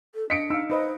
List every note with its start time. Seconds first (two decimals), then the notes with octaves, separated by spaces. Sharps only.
0.15 A4
0.30 D4 D#5 B6 C#7 D7
0.50 D#4 F5 E6
0.70 D#4 B4 C5 D#5